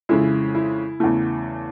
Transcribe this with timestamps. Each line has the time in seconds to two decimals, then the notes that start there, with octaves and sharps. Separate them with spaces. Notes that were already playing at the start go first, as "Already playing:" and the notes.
0.09 F2 C#3 E3 G#3 E4
0.55 E4
1.00 E2 C#3 E3 A3